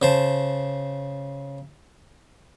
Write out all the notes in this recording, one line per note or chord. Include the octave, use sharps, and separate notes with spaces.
C#3 C5 A5